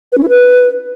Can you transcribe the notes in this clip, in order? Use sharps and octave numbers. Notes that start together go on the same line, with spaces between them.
B4
C#4
E4
B4